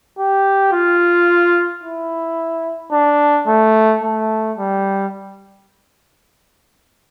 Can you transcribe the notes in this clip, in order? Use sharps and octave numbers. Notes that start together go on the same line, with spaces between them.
G4
F4
E4
D4
A3
A3
G3